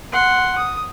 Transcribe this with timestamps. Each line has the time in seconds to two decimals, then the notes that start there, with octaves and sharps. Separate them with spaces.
0.13 F#5 C6
0.58 D#6